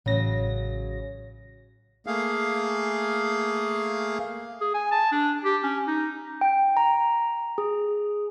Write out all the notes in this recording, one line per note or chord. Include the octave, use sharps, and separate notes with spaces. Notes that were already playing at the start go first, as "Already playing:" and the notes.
A1 C#3 F#3 A#6
A3 A#3 G#4 F5
G#4
G#5
A5
D4
G4
C#4
D#4
G5
A#5
G#4